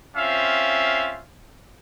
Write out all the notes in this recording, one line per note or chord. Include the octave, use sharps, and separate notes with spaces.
C4 C#4 F4 E5 F5